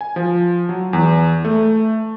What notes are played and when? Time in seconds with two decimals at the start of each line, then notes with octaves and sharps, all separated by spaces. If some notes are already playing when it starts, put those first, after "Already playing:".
0.01 G#5
0.16 F3
0.69 F#3
0.93 E2
1.45 A3